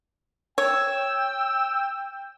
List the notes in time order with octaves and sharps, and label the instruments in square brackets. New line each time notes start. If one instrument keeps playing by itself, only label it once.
[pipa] C#5 [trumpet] G5 [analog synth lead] E6